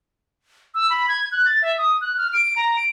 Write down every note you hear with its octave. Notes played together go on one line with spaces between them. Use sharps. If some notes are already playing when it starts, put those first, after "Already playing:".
E6
B5
G#6
F#6
A6
E5
D#6
F#6
F6
D7
A#5
D7